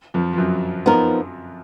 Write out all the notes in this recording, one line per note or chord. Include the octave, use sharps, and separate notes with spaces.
F2 F3
F3
F#2 F#3
F3 B3 D#4 A#4